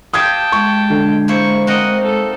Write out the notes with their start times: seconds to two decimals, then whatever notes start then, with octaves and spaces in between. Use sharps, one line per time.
0.14 G4 A4 F5 G5 A5 D#6 G#6
0.52 G#3 C#6
0.90 D3
1.28 A#3 E4 C5 C#6
1.67 C4 F#4 A#4 D#5 F#5
2.01 D#4 A4